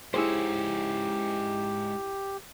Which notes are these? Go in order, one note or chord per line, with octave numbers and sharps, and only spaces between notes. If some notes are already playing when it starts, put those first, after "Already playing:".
G#2 C#4 E4 G4 G#4 C5